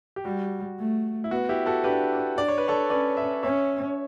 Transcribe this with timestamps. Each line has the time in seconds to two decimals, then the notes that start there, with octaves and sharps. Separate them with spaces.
0.16 G4
0.25 G3 F#4
0.79 A3
1.24 E4
1.31 B3 F#4
1.49 E4 G4
1.66 F#4 A4
1.84 D4 G4 B4
2.37 D4 D5
2.48 C#5
2.58 B4
2.68 A4 C#5
2.90 C#4 B4 D5
3.17 C#5 E5
3.43 C#4 C#5 E5